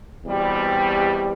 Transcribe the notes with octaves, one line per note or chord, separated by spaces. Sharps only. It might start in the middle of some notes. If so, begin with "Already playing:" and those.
E2 B2 G3 C4